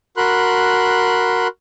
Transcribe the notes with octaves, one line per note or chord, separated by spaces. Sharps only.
F#4 A#4 B5 C6 F#6